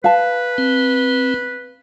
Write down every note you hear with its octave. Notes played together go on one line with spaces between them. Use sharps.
B4 F5 A5
C4